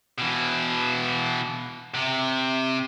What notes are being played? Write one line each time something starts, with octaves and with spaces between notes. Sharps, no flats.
B2 E3
C3